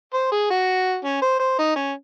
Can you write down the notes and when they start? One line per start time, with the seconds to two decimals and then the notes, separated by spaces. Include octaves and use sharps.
0.14 C5
0.32 G#4
0.50 F#4
1.05 C#4
1.22 C5
1.39 C5
1.59 D#4
1.76 C#4